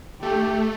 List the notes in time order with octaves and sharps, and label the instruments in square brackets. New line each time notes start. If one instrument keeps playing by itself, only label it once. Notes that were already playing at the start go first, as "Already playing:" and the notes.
[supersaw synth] A3 [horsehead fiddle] G4